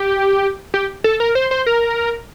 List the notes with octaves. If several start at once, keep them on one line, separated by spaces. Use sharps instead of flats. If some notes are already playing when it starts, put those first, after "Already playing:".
Already playing: G4
G4
A4
A#4
C5
C5
A#4